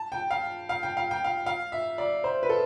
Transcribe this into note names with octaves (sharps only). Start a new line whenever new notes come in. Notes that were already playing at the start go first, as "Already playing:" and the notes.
Already playing: A5
G5
F5
F5
G5
F5
G5
F5
F5
E5
D5
C5
B4
A4